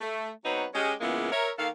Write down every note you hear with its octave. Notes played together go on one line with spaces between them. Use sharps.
A3
F#3 B3 C4 D#4 B4 C#5
G#3 C#4 G4
C#3 E3 G#3 A#3 B3 F4
A#4 C#5 E5
D#3 A#3 A4 F5